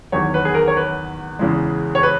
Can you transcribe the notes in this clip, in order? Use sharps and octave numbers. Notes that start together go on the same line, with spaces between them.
E2 D#3 F#3 C#5
B4
G#4
A#4
C#5
B4
E2 C#3 E3 G#3
C#5
B4